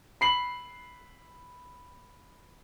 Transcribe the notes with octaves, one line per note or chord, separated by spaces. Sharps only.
B5 C7 F#7